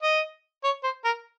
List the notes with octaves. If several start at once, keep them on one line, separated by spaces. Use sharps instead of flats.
D#5
C#5
C5
A#4